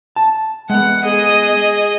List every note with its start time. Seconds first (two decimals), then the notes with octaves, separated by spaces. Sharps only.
0.16 A5
0.70 G#3 B3 F#5
1.03 G#4 D#5